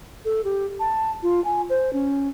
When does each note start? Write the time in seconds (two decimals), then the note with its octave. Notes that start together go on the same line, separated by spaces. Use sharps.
0.25 A4
0.44 G4
0.80 A5
1.23 F4
1.44 G#5
1.69 C5
1.93 C#4